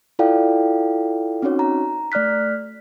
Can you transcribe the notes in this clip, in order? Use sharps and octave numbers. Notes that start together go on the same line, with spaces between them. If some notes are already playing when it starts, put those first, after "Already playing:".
E4 F4 A4 D5 F5 G5
C4 C#4 D#4 F#4 C#5
A#5
A3 D5 F6 F#6 B6